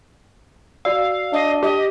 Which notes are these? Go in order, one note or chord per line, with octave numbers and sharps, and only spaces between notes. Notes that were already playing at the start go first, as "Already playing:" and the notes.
F#4 D5 F5 E6
D4 D#5
G4 D#5